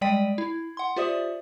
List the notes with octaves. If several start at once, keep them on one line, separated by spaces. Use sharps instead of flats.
G3 G#3 D5 G5 B6 D#7
E4
F#5 C6
F4 G4 C5 D5 E5 D#6